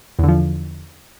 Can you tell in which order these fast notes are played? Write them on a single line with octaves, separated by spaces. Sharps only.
E2 D3 F3